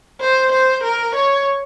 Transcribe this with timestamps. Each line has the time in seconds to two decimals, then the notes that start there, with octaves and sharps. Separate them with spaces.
0.21 C5
0.52 C5
0.84 A#4
1.16 C#5